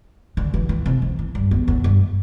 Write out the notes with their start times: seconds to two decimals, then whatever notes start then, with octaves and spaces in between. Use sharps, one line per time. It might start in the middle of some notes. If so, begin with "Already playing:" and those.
0.37 D3
0.54 E3
0.69 E3
0.86 C3
1.02 E3
1.19 E3
1.35 G2
1.51 E2
1.68 E2
1.84 G2